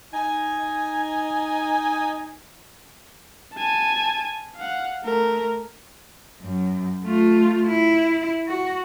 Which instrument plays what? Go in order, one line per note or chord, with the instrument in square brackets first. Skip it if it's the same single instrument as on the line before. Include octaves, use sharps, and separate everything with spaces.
[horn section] D#4 G#5
[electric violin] G#5 A5
F5 F#5
A3 A#4
[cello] F#2
A3 F4
E4
F#4